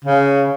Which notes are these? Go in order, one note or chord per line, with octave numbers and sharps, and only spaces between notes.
C#3